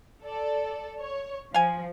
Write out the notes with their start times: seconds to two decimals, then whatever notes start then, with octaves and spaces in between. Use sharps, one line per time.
0.24 A4 D5
1.00 C#5
1.54 F3 F5 G#5